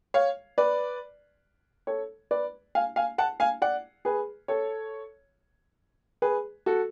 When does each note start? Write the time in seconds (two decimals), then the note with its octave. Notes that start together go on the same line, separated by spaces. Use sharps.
0.14 C#5 F5
0.58 B4 D5
1.87 A4 C#5
2.31 B4 D5
2.75 F5 G#5
2.96 F5 G#5
3.18 F#5 A5
3.40 F5 G#5
3.62 D5 F#5
4.05 G#4 B4
4.48 A4 C#5
6.22 G#4 B4
6.66 F#4 A4